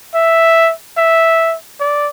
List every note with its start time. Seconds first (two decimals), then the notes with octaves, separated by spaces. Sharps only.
0.14 E5
0.97 E5
1.80 D5